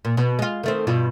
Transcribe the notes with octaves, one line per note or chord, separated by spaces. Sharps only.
A#2
B2
G#3 F4
D#3 A3 C4
G2 B2 F4